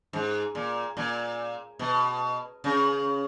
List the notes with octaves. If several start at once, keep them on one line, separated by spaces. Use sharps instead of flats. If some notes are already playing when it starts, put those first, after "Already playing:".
G#2
A#2
A#2
B2
C#3